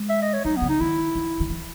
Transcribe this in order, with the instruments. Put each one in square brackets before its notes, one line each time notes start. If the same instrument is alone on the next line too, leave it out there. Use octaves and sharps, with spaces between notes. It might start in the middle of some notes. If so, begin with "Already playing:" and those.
Already playing: [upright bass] G#3
[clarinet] E5
D#5
C#5
[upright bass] F#3 [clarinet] D#4
[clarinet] B3
[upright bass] C#3
[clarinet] D#4
[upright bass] D#3 [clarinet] E4
[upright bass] D#3
D#3
E3